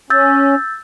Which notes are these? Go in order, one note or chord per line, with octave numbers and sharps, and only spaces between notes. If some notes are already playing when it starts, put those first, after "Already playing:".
C#4 E6 G6 A6